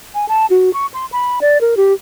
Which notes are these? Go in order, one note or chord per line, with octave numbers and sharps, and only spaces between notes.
G#5
A5
F#4
C#6
C6
B5
D5
A#4
G4